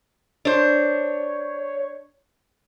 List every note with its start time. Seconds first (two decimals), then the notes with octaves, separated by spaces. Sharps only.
0.45 D4 C5 C#5